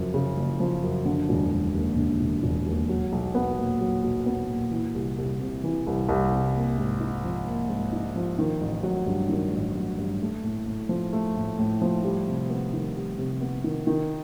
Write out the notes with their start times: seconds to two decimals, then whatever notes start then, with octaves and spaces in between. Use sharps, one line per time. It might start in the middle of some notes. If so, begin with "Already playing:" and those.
Already playing: F#1 F#2 C#3 F3
0.14 C#3
0.37 F#1
0.60 F3
0.83 F#2
1.05 D3
1.29 E1
1.51 E1
1.75 D#2
1.97 D3
2.20 E1
2.43 E1
2.66 D#2
2.89 F#3
3.12 B1
3.35 B3
3.58 A#2
3.81 F#3
4.04 B1
4.26 B3
4.49 A#2
4.71 E3
4.94 C2
5.18 C2
5.40 C3
5.64 E3
5.87 C2
6.09 C2
6.32 C3
6.55 A#3
6.78 G#2
7.00 D#4
7.24 F3
7.46 A#3
7.69 G#2
7.92 D#4
8.16 F3
8.39 D#3
8.61 A1
8.83 F#3
9.06 G2
9.29 D#3
9.52 A1
9.75 F#3
9.98 G2
10.21 A3
10.44 A2
10.67 A2
10.89 F3
11.13 A3
11.36 A2
11.58 A2
11.82 F3
12.04 G3
12.27 C3
12.50 B3
12.73 D#3
12.96 G3
13.18 C3
13.41 B3
13.64 D#3
13.87 D#3